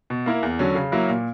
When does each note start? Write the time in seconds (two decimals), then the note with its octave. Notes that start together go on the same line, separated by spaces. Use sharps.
0.10 B2
0.26 A#3 E4 A#4
0.43 E2
0.59 D3 F#3 C#4
0.75 C#3
0.92 F#3 A#3 E4 A#4
1.10 A#2